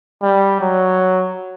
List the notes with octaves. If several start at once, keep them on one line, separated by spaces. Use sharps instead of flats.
G3
F#3